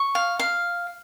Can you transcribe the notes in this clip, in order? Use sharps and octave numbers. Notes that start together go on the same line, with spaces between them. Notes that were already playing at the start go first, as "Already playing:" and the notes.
Already playing: C#6
F5
F5